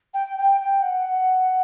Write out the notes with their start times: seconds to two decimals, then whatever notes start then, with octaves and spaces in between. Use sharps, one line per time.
0.14 G5
0.38 G5
0.61 G5
0.83 F#5